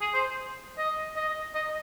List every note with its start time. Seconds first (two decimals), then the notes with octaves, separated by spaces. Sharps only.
0.01 G#4
0.14 C5
0.78 D#5
1.16 D#5
1.55 D#5